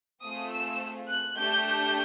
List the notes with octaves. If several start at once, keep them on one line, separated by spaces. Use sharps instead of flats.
A3 C4 F4 G#4 D#6
E6
F#6
A3 D4 G4 G6
G6